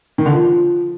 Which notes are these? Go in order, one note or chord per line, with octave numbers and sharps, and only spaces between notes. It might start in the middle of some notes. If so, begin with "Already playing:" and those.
D#3
D3
F3